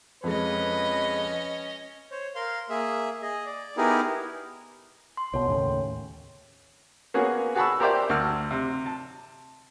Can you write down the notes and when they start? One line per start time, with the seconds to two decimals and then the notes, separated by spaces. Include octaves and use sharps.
0.24 F2 G#3 C#4 B4 D#5
2.11 C5 C#5
2.35 A#4 F5 C6
2.70 A#3 G#4 E5
3.22 G#4 D#5
3.46 D5
3.77 B3 D#4 E4 G4 G#4 A#4
5.17 C6
5.34 C2 B2 C#5
5.48 D#2 A2 C#3
7.14 A#3 B3 C#4 F#4 G#4 A#4
7.56 F#4 G#4 A5 B5 C#6 E6
7.80 G4 A#4 C5 D5 E5 G5
8.09 D2 F#4 E6 F6
8.51 C3
8.86 A5